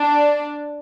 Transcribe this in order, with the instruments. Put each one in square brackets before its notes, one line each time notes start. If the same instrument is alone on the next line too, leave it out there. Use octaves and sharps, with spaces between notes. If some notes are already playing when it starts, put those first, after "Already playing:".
Already playing: [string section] D4